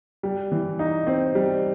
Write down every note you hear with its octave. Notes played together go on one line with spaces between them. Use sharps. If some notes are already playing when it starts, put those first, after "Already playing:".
G3
E3
D#4
C4
G3